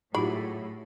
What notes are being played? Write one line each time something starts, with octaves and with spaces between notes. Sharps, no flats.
A2 F#3 D#4 F4 G4 G#4 B5